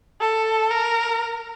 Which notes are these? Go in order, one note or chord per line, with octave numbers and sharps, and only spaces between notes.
A4
A#4